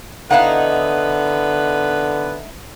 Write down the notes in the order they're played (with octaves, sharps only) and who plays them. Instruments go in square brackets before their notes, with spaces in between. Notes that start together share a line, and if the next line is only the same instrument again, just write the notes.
[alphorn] D3 [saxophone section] B3 B4 [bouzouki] D#4 E4 [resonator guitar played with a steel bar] F5 F#5